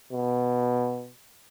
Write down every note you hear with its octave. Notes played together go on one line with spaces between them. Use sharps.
B2